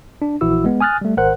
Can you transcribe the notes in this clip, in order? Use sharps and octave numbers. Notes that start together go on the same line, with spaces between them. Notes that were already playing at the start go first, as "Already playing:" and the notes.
D4
A#1 E3 E4 F#4 E6
G#3 B3
G#5 D#6 F6 F#6 A6
G3 A3
G#1 A#4 C5 F#5 F#6